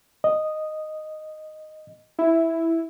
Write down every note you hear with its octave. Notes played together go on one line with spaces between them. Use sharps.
D#5
E4